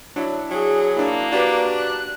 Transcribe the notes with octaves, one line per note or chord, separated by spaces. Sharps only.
F#3 D4 E4
F#3 G#4
A#3 D4 E4
D4 F#4 G4 B4 A#5
F#6